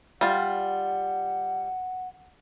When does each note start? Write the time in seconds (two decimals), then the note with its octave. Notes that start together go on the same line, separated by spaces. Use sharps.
0.21 G3 F4 F#5